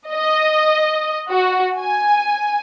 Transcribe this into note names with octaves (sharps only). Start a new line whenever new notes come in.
D#5
F#4
G#5